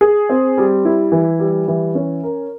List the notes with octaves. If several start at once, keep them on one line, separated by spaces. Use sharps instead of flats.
G#4
C4
G3
E4
E3
G3
E3
C#4
A#4